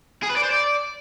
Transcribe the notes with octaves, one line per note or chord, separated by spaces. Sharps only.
G#4
B4
D5
C5
D5